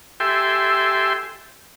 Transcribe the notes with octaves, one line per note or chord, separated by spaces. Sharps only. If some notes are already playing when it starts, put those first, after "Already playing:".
G4 A4 E5 G5 G#5 C6